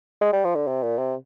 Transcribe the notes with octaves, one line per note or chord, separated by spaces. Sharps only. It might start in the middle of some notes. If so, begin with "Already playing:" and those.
G#3
G3
F3
D3
C3
A#2
C3